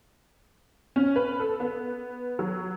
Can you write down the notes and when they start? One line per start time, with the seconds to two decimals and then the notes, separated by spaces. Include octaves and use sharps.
0.96 C#4
1.16 B4
1.40 A4
1.60 B3
2.39 F#3